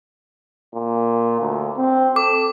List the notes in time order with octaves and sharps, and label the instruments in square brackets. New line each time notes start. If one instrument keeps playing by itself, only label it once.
[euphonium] A#2
D2
C4
[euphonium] A4 [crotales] D6